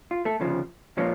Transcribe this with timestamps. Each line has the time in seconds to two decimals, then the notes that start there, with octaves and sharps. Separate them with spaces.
0.11 F4
0.25 A3 A4
0.40 D2 C#3 F3
0.97 A#2 F3 A#3 C#4 C#5